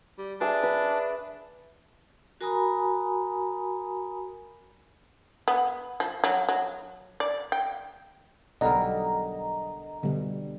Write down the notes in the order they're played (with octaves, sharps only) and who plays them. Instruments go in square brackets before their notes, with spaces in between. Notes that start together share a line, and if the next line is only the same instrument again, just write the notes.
[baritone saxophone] G3
[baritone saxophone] D4 [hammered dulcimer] G#4 B4 E5
[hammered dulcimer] B4
[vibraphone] F#4 A#4 G#5 A#5 B5 D#6
[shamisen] B3
F3
F#3
F#3
D5
G5
[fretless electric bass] B1 B2 [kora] D3 G3 A#4 [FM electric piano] D#5 A#5
[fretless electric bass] B2 [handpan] D3 G3